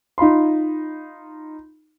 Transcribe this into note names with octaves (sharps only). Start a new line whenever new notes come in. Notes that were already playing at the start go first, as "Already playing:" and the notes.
D#4 F4 B5 C6